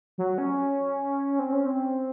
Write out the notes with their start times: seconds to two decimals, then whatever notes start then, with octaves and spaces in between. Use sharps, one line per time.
0.18 F#3
0.38 C#4
1.39 C4
1.52 C#4
1.66 C4